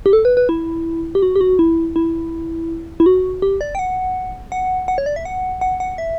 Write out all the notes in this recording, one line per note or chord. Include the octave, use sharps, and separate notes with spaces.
G4
A4
B4
B4
E4
G4
F#4
G4
F#4
E4
E4
E4
F#4
G4
D5
G5
F#5
F#5
F#5
C#5
D5
E5
F#5
F#5
F#5
E5